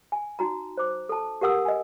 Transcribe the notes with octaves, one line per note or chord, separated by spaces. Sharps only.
G#5
D#4 F#4 A#5
C5 D6
A4 A5
G4 A#4 F#5 D#6 E6
D#5 G#5